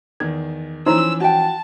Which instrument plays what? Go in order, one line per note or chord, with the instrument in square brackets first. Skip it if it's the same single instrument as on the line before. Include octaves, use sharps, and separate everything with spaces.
[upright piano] E2 D#3 [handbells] G#6
[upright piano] E3 F3 C#4 [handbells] D#4 E4 A#5 [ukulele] C5 [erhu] E6
[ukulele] F#4 G5 [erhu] A5